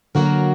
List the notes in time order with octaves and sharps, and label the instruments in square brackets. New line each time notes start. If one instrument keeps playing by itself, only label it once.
[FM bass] D3 [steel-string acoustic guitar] F#3 A#3 F#4 A#4